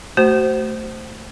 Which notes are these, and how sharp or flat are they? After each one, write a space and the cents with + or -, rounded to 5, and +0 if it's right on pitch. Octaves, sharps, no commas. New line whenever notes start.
A3 +0 F#4 +35 C5 +0